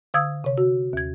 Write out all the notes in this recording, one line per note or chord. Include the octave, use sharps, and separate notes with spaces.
D3 F5 D#6 E6 G#6
C3 C#5
F#4
D#2 G#6